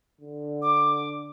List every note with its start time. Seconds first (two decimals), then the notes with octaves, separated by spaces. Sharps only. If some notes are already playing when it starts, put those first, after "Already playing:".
0.21 D3
0.62 D6